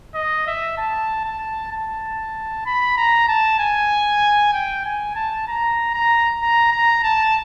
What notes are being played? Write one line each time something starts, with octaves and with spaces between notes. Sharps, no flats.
D#5
E5
A5
A5
A5
B5
A#5
A5
G#5
G5
G#5
A5
A#5
A#5
A#5
A#5
A5